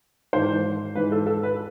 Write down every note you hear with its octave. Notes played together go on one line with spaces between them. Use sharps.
G#2 E3 C5
G#2 E3 B4
A4
A4
B4